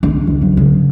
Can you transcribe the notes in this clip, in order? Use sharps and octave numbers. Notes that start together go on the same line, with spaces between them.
D4
C#2
F#3
C#3